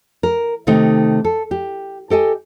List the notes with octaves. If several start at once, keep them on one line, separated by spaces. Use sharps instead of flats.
A#4
C3 D#3 A3 D#4
A4
G4
G4 A4 D#5 G#5